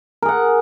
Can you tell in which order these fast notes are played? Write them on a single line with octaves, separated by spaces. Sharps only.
A#4 G#4 F#5